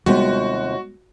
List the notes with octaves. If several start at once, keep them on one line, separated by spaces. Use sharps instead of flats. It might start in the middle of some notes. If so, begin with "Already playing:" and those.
D#2 C3 F3 G3 G#3 B3 F#4